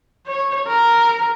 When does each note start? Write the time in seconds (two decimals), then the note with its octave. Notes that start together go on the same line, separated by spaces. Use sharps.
0.26 C#5
0.67 A#4